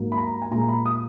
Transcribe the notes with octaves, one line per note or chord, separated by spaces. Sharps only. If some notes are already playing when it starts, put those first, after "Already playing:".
Already playing: G#2 F#3 A#3
B5
A#5
G#5
A#2 G#3 A#5
B5
D#6